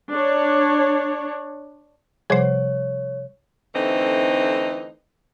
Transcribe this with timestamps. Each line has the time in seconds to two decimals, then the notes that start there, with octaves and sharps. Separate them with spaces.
0.13 D4 C#5
2.30 C3 F3 G3 G#4 C5 C#5
3.74 D3 E3 A3 C4 D#4